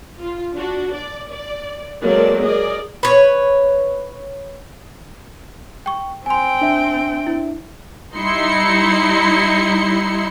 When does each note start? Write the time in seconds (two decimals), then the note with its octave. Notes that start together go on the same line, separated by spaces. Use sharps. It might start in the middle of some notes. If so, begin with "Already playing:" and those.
0.19 F4
0.55 D4 F#4
0.93 D5
1.31 D5
2.02 F#3 G#3 A#3 C4 A4 D5
2.42 G#4 A#4 D5 D#5
3.03 B4 C#5
5.86 G5 C#6
6.26 C4 G5 G#5 C6
6.62 D4 E5
7.27 E4
8.14 G3 D#4 E4 C6 C#7